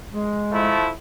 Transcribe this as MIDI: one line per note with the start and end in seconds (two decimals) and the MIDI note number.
0.12 0.71 56
0.51 0.89 53
0.51 0.89 57
0.51 0.89 64